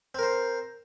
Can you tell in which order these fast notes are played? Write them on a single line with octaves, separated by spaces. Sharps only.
C4 A#4 C5